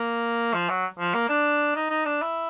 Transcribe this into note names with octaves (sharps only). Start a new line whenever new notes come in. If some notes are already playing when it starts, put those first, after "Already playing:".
Already playing: A#3
F3
F#3
F3
A#3
D4
D#4
D#4
D4
E4